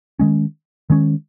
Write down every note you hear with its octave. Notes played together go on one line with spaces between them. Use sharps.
D#3 G#3 C#4
D#3 G#3 C#4